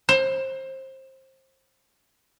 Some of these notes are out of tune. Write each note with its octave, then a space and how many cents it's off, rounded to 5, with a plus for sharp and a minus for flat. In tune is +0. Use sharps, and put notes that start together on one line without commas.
C5 +25